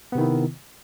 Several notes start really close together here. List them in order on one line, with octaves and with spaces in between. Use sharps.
B3 C3 D#3 E4